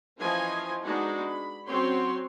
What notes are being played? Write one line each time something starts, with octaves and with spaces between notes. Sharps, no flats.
E3 F3 C#4 F4 D#5 G#5
G#3 B3 D4 D#4 F#4
B5
F#3 C4 C#4 F#4 C#5 C6